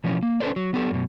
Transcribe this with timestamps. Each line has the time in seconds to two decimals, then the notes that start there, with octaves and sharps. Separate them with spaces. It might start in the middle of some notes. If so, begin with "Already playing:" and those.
0.04 B2 E3 F3 C#4
0.23 A#3
0.40 C#4 D4 A4 B4 C5 D5
0.56 F#3
0.73 F#3 B3 G4 A4
0.90 F#2 B2